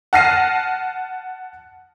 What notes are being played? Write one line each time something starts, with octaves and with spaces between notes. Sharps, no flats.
F#5 A5 F6 A#6 C7 D#7